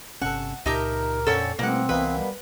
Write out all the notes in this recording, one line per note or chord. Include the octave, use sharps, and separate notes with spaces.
G1 C3 C#4 A4 F#5 A5 C#6
C#2 A#2 D#4 G4 A#4 E5 A5 A#5
F2 A#2 D3 C4 C#4 A4 C#5
A1 B2 G3 A#3 C4 F#5
C2 B2 E3 A#3 B3 B4
G3